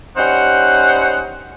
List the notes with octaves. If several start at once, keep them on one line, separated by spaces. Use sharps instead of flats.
G3 C#4 D#4 C5 F#5